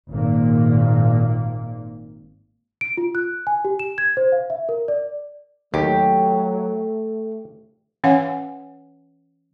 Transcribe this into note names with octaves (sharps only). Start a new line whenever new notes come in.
G#1 A#2 A#3
D7
F4
F#6
G#5
G4
E7
G#6
C5
F5
E5
A#4
D5
D#2 F#3 A3 G4
E3 C#4 C#5 F5 F#5 G#5